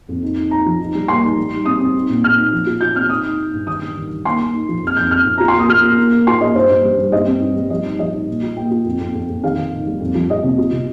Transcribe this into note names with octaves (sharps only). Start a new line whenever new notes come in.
F2
D#4
D#4
D#4 A#5
F3
D#4
G3
A#3 C6
D#4
G3
D#4
C4 D#6
C4
D#4
A#2
A#2 F6
D#4
F3
F4
F4 G6
C4 F6
D#4 D#6
D#4
D#4
G2
D#3 D#6
G3
D#3
D#3
A#3 C6
A#3
D#4
F3
F2 F6
F2 G6
F2 F6
F2
F4 A#5
C6
A#3 D#6
F4 F6
A#3
A#3
A#3
F4 C6
A#3 D#5
G2 C5
G2
G3
G3
G2 D#5
C4
G2
G3
F3 D#5
D#4
F3 D#5
D#4
A#2
F4
A#3 G5
F4
F2
F2
F2
F2
D#3 F5
D#3
D#3
G3
F2
F3
F2 D#5
C3
F4
C3